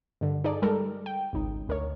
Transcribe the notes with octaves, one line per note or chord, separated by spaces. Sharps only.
G2 D3
D#4 G#4 A4 D5
G3 G#3 A4 A#4
G5
G#1 C#2 D#4
D2 A#4 C#5